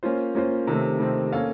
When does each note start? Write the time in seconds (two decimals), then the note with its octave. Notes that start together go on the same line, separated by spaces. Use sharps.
0.03 A#3 C#4 F4 C5
0.35 A#3 C#4 F4 C5
0.67 C3 D#3 A3 C4
0.99 C3 D#3 A3 C4
1.32 A#3 C#4 A4 C#5 F5